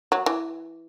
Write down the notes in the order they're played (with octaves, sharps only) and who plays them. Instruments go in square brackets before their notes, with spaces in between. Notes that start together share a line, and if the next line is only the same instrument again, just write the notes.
[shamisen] F#3
E3